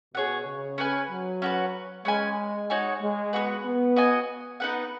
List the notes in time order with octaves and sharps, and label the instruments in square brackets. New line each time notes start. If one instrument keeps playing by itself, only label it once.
[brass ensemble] B2 [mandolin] G#4 C#5 F#5
[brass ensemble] C#3
[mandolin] C#4 B4 G#5
[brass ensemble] F#3
[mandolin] C#4 F#4 B4
[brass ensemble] G#3 [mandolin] C#4 B4 G#5
[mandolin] D#4 F#4 C#5 G#5
[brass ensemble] G#3
[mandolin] B3 F#4 B4
[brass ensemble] B3
[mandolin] F#4 D#5 G#5
B3 D#4 B4 F#5